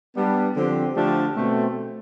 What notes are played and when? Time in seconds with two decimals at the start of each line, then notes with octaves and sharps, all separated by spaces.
0.16 G3 B3 D4
0.55 D3 F3 C4 G4
0.95 D3 F3 A3 D4 G4
1.35 B2 A3 C4